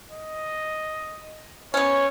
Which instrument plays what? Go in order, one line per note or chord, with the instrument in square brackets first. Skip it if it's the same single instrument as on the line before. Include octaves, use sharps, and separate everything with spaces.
[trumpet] D#5
[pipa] B3 C#4 [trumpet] C#5